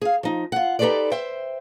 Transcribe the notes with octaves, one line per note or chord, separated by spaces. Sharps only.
G#4 F5
F3 D#4
F4 F#5
D#4 G4 A4 B4 C5 D5
C5 E5 G5